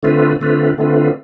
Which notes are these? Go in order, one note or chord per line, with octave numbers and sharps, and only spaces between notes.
D3 A3 C4 F4 B4
D3 A3 C4 F4 B4
D3 A3 C4 F4 B4